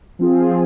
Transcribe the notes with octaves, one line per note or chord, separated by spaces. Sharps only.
F3 C4 F4 G#4